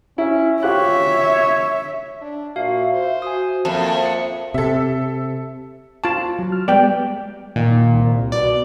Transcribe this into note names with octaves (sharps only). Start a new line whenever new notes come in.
C#4 E4
F4 G4 C#5 E5 F#6
D4
A#2 F#4 E5 F5
C5
F#4 G#5 D#6
F2 A#3 E5 A5
C#7
C3 A4 E5
F4 A5 C#6
F#3
F6
G3 G#3 B3 D5 G5
A#2 D#3
C2
B2 D5